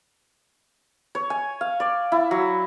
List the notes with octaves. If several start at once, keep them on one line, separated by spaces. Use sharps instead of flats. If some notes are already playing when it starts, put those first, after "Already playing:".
C#5
G#5
F5
D5
E4
F#3